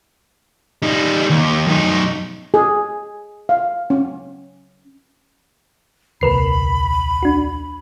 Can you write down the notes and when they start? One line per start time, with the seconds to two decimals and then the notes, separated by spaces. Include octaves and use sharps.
0.82 G3 D#4
1.30 D#2
1.67 F#2 D#4
2.54 G#4
3.49 F5
3.90 C#4
6.21 D#1 C2 A#4 B4 B5 C7
7.23 D4 F#4